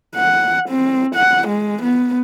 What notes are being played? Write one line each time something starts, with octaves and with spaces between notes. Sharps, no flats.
F#5
C4
F#5
G#3
B3